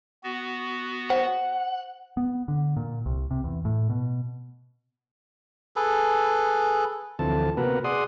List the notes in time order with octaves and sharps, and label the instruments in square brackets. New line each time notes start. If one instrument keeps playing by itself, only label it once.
[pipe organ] B3 F#4
[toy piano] C5 [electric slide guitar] F#5
[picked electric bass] B3
D3
A#2
C2
C3
E2
A2
B2
[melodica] G#4 A4 B4
[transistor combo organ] D2 E3 F3 C4 A4 A5
C3 A#3 B3 F#4 A#4 B4
G#4 D5 F#5 C6 D#6